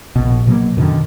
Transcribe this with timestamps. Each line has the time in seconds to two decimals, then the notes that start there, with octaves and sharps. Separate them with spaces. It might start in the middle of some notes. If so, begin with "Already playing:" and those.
0.16 A#1 B2
0.47 B2 F#3 A#3
0.77 F#2 B2 D3 D#3